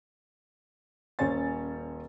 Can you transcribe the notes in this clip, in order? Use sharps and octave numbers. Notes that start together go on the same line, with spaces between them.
D#1 C#4 C5 C#5 G#5 A6